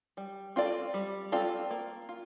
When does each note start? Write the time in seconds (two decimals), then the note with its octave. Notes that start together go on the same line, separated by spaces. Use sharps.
0.17 G3
0.56 C4 F4 A4 D5
0.94 G3
1.32 C4 F4 A4 D5
1.71 A#3
2.09 F4